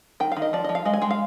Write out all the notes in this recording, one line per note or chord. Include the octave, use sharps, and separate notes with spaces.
D#3 G5
D#3 F5
D#5
F3 D5
F3 D#5
F5
G#3 D#5
G#5
G#3 G5
F5